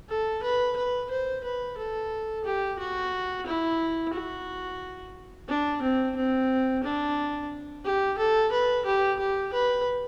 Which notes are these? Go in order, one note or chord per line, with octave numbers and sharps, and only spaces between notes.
A4
B4
B4
C5
B4
A4
G4
F#4
E4
F#4
D4
C4
C4
D4
G4
A4
B4
G4
G4
B4